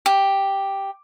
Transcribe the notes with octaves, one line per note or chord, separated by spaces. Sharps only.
G4